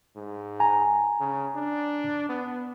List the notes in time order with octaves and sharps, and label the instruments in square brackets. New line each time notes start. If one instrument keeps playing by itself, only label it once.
[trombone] G#2
[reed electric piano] G#5 A#5
[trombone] C#3
D4
B3